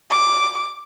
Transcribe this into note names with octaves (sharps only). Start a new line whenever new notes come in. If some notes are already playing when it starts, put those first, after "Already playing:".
D6